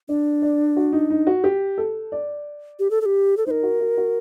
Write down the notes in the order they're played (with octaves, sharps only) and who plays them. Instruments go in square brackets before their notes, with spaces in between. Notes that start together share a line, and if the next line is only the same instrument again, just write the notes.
[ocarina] D4 [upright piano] D5
[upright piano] D5
F#4
D#4
D#4
F#4
G4
A4
D5
[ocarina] G4
A4
A4
G4
A4
[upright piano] D#4 [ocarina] A#4 C5
[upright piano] F#4
F#4
F#4